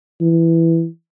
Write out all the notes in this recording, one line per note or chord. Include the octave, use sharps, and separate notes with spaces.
E3